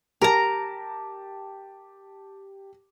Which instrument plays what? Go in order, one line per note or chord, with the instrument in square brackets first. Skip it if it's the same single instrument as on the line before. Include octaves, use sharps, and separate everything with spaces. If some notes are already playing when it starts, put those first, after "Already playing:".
[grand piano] G4 A5 [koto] A#4 A#5